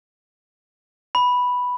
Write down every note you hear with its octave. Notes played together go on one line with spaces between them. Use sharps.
B5